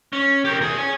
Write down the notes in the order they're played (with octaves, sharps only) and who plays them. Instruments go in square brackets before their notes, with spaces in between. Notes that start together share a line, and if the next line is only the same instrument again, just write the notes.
[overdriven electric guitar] C#4
G4 A#4
E2 G#4
C#5 G#5